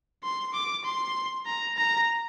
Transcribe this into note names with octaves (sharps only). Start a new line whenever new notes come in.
C6
D6
C6
A#5
A#5